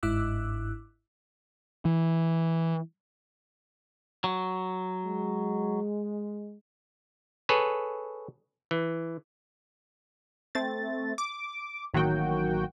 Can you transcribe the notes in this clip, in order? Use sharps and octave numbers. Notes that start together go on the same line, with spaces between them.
G1 G#2 E4 D6 E6 F#6
E3
F#3
G#3
G#4 A4 B4 C#5
E3
A3 C4 A6
D6
A1 D#3 F#3 A#3 F#4 G5